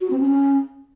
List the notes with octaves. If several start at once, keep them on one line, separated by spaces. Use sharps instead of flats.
F#4
C4
C#4